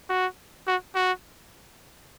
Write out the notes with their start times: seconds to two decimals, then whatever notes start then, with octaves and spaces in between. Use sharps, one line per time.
0.09 F#4
0.67 F#4
0.95 F#4